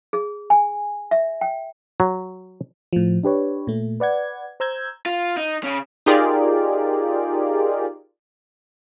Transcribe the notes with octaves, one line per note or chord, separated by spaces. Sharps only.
G#4
G#5
E5
G5
F#3
A2 F3
D4 G4 B4 C#5
A#2 A3
B4 D5 F#5 G#6
C5 A#5 E6 G6 G#6
F4
D#4
C#3 C#4
D#4 F4 G4 G#4 A#4 D5